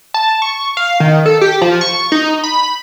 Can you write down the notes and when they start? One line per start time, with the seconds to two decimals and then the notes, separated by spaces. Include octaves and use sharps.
0.14 A5
0.42 C#6
0.77 F5
1.00 D#3
1.26 A4
1.41 G4
1.61 F3
1.81 C#6
2.12 D#4
2.43 B5